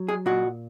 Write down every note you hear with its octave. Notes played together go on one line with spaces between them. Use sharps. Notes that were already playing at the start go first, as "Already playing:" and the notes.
Already playing: F#3
G#4
A#2 F#4